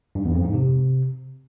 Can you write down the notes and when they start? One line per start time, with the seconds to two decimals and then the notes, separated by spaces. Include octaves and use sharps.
0.15 G2
0.25 E2
0.35 F2
0.44 G#2
0.54 C3